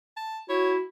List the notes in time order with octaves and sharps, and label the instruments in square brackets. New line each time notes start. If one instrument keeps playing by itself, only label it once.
[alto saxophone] A5
[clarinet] E4 [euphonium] F#4 [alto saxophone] C#5